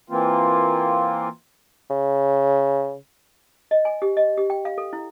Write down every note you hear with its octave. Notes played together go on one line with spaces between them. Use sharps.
E3 A#3 C4 F4
C#3
D#5
G#5
G4
D#5
G4
G5
F5
A4
E4